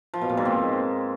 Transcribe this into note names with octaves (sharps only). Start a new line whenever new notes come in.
F3
B2
A#2
G#2
C4